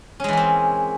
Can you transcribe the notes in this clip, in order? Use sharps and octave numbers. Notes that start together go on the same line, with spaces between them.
E3 G#3 A#3 C4 C#4